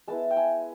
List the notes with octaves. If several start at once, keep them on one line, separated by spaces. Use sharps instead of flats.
G#3 B3 E4 A5
G5
G#5